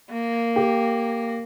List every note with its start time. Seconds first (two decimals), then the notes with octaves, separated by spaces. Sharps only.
0.11 A#3
0.56 G4